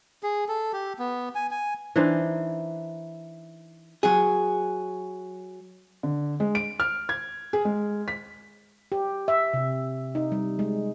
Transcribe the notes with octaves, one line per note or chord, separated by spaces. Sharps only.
G#4
A4
G4
B3
G#5
G#5
E3 D4 D#4 C5
F#3 G#4
D3
G#3
D7
F6
G#6
G#4
G#3
B6
G4
E5
C3
D#4
G3
G#3